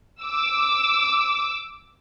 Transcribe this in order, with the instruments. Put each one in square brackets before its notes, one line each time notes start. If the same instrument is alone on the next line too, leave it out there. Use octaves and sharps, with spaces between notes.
[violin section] D6 E6